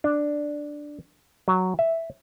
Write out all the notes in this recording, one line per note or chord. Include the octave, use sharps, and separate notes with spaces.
D4
F#3
E5